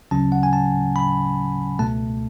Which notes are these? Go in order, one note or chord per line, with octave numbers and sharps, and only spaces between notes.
D2 C#3 F#3 C#4 A5
F#5
G#5
A5
B5
C#2 B2 A3 A5